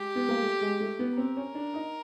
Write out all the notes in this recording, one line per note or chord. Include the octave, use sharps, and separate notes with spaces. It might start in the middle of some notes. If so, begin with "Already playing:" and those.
Already playing: G#3 G4
B3
A#3
A3
G#3
A3
B3
C4 A#4
C#4
D4
D#4